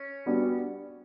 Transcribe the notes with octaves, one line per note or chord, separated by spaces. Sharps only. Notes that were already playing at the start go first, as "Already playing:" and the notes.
Already playing: C#4
G3 B3 D4 F#4